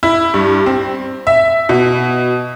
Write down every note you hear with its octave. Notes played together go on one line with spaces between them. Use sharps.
E4
G2
C4
E5
B2